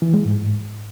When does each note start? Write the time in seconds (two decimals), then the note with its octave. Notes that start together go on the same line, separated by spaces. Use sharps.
0.02 E3
0.14 G#3
0.25 G#2